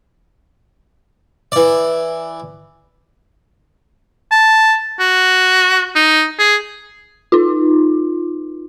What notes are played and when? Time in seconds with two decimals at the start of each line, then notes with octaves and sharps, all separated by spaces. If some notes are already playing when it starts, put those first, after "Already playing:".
1.52 E3 D5
4.31 A5
5.00 F#4
5.95 D#4
6.39 G#4
7.32 D#4 F4